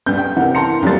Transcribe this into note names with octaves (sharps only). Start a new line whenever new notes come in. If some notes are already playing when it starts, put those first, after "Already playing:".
G2 B3 G6
G5
C3 E3 A#4 F#5
A5 A#5 C6 C#7
F2 E3 F#3 G3 A#3 A6